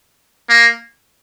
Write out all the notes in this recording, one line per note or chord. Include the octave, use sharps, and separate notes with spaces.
A#3